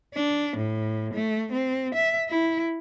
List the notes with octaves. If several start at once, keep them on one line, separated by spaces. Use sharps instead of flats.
D4
A2
A3
C4
E5
E4